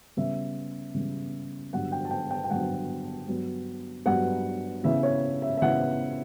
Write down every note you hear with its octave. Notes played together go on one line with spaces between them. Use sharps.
C#3 G3 B3 E5
C#3 G3 B3
G2 D3 F#3 B3 F#5
G5
A5
G5
G5
G5
G2 D3 F#3 B3 F#5
G2 F#3 B3
G2 F#3 B3 F#5
C#3 E3 B3 E5
C#5
E5
E5
C#3 E3 B3 F#5